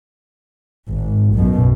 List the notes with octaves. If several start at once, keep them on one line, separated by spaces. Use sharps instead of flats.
G#1
B1 F#2 B2